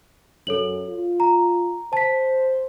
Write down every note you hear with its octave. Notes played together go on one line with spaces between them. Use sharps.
F#2 A4 C#5 F#7
F4
A#5
C5 A5 B6